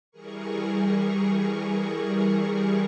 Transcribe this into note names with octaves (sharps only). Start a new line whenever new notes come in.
E3 G3 G#4 A#4 C#6